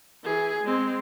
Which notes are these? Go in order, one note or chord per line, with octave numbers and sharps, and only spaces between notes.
E3 G#4
G#3 C4